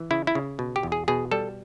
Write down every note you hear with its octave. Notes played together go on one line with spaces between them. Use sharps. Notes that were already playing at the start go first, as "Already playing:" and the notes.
Already playing: E3
C#3 E4
E4
C#3
B2
G4
E2
G#4
B2 G#4
G3 A4